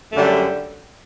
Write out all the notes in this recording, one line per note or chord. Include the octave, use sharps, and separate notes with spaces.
F#2 D3 G3 A3